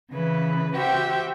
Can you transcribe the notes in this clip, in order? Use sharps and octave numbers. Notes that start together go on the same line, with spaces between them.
C#3 E3 B4
F#4 G4 C5 E5 G5